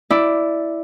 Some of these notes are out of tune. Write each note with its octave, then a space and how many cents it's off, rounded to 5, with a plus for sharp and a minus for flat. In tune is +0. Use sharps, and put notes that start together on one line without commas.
E4 +0 D5 +0